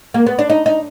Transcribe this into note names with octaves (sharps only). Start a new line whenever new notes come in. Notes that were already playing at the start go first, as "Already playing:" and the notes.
A#3
B3
D4
D#4
D#4